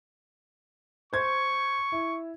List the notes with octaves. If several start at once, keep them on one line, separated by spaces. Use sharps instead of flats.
C5 C#6 G#6
E4